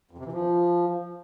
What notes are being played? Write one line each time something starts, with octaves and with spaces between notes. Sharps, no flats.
F2
C3
E3
F3